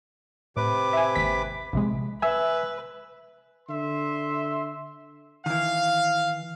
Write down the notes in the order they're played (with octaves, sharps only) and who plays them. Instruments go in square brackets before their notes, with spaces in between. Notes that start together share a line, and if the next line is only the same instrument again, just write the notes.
[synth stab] A2 [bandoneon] C3 B4 D6
[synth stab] E5 G#5
G#1 D#2 B6
A#1 C3 G#3
[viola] B4 [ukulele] E5 [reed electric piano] G#5 E6
[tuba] D3 [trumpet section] E5 C6
[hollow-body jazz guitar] D#3 E3 [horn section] F5